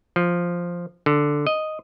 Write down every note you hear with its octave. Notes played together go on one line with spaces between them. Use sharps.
F3
D3
D#5